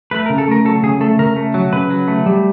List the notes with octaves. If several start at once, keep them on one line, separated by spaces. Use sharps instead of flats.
A3 B4
A#4
C#3
A4
A3 A#4
F#3 A4
C#3 G#4
A3 A4
C#3 A#4
A3
F#3
C#3 B4
F#3
A3
G3